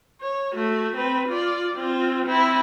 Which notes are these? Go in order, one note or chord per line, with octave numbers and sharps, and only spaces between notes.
C#5
A3 F#4
C4 B4
F4 D5
C4 F4
C4 E4